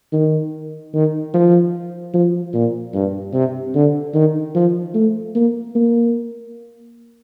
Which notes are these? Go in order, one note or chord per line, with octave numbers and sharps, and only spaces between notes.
D#3
D#3
F3
F3
A#2
G2
C3
D3
D#3
F3
A3
A#3
A#3